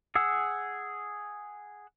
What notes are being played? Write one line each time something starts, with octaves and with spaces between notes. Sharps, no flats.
G#4 F#5 E6